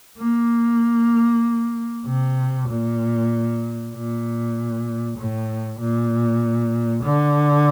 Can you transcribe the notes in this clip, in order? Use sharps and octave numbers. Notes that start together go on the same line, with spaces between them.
A#3
C3
A#2
A#2
A2
A#2
D3